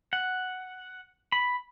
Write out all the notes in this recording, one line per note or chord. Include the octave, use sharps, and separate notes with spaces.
F#5
B5